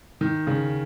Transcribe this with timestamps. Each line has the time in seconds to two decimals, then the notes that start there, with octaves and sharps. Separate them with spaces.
0.21 D#3
0.47 C#3